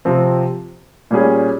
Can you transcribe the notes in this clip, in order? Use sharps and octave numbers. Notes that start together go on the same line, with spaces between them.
C3 F3 C4
A#2 G3 C#4 G#4